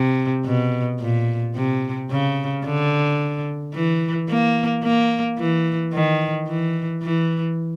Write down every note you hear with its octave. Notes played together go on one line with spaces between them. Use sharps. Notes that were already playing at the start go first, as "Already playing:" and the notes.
Already playing: C3
B2
A#2
C3
C#3
D3
E3
A#3
A#3
E3
D#3
E3
E3